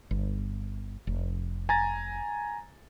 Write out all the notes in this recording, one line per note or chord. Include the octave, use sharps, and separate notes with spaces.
G1
F1
G#5 A#5 A6